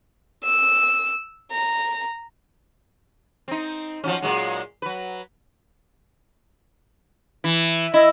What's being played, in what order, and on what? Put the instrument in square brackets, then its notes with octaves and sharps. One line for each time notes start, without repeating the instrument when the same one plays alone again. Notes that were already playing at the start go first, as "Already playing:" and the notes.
[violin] E6
A#5
[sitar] C4 D#4
F3 F#3 C#4
A#2 F#3 G#3
F#3 B4
E3
[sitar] E4 [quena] D#5